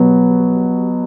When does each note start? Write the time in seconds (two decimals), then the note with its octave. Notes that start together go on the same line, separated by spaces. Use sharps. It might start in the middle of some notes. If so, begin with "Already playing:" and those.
Already playing: B2 F#3 B3